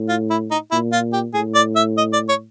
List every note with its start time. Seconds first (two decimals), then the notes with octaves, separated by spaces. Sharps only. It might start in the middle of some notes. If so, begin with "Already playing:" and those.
Already playing: A2
0.09 F4
0.30 E4
0.51 D#4
0.71 A#2 E4
0.92 F4
1.13 G4
1.34 A2 G#4
1.55 D5
1.76 E5
1.98 D#5
2.13 D5
2.29 C#5